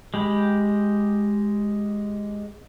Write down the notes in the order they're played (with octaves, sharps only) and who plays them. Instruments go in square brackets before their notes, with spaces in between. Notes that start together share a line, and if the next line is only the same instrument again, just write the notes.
[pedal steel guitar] G#3 G4 B5